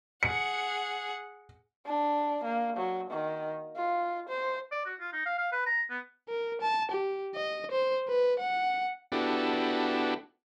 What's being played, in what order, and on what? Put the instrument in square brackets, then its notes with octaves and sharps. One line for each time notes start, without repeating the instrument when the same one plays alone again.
[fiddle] G#4 F#5 [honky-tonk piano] C#7
[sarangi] D4
A#3
F#3
D#3
F4
C5
[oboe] D5
F#4
F4
D#4
F5
F5
B4
A#5
B3
[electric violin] A#4
A5
G4
D#5
C5
B4
F#5
[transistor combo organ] B3 D4 E4 F#4 G4 A4